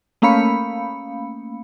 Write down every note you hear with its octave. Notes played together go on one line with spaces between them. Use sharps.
A3 A#3 C#4 F5 B5 C#7